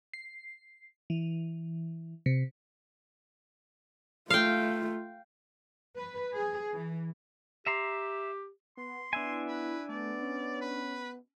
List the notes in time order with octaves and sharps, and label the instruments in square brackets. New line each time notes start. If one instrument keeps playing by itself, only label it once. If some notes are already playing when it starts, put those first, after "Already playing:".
[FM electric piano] C7
E3
C3
[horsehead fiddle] A3 F4 [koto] F5 G5
[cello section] B4
G#4
E3
[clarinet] G4 [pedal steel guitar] E5 A#5 C6
[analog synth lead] B3 [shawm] C6
[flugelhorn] B3 [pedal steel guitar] D4 E5 G#5 [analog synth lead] E4
[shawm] B4
[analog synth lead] A3 [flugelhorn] B3 [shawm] D5
[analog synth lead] C#4
[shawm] B4